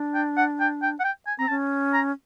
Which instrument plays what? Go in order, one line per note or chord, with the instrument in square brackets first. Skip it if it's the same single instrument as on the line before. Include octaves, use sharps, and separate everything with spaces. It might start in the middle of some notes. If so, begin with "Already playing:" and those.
Already playing: [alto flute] D4
[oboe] G5
F#5
G5
G5
F#5
G5
G#5
[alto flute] C4 [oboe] A#5
[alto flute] C#4 [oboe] A5
[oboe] A#5